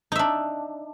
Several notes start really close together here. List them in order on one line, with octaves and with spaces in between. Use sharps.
D#4 E5 D4